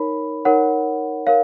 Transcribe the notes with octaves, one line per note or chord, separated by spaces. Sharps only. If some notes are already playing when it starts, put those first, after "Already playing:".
Already playing: D#4 A#4 C#5 B5
D#4 A#4 C#5 F#5
A#4 C#5 F5